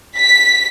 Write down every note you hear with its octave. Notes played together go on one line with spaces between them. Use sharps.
B6